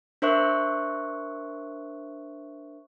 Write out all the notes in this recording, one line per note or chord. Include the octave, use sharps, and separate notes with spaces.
D4 A#4 C5 E5 C#6 F#6